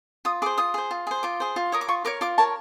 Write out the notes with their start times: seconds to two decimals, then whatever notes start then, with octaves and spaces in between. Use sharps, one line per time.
0.25 F4 D#6
0.42 G#4 D6
0.46 C5
0.58 F4 D#6
0.74 G#4 C5
0.91 F4
1.07 G#4 C5
1.23 F4 D6
1.40 G#4 C5
1.56 F4
1.72 A#4 C#5 D#6
1.81 D6
1.88 F4 C#6
2.05 A#4 C#5 D6
2.21 F4 D6
2.38 A#4 C#5 A5